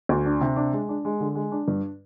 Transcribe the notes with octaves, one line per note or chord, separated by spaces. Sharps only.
D2
D4
C3
D4
G#3
D4
G#3
D3
G#3
D4
G2